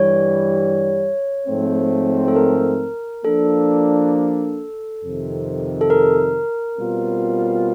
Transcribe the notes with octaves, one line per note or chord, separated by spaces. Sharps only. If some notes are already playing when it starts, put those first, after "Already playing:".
Already playing: G2 E3 G3 C#5
G#2 F3 A3 C4
A4
A#4
F3 A#3 D4 A4
F2 C3 D#3
A4
A#4
B2 G3 C4 F4